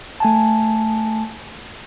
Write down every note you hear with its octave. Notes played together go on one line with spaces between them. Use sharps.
A3 G#5 A5